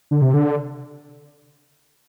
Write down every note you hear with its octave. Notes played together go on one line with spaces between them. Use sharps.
D3
C3
D3